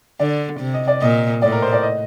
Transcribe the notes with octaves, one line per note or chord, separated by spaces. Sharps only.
D3 D5
C3
D#5
D5
A#2 D#5
A2 D5
A#4
C5
D5
D#5